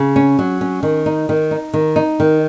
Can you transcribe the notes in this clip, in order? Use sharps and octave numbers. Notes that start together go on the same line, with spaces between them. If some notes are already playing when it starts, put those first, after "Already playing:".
Already playing: C#3
C#4
F#3
C#4
D#3
D#4
D#3
D#4
D#3
D#4
D#3